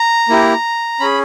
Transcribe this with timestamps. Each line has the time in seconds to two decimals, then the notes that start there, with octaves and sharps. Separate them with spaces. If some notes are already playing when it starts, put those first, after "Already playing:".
Already playing: A#5
0.29 A#3 E4 G4
1.00 C#4 G#4 B5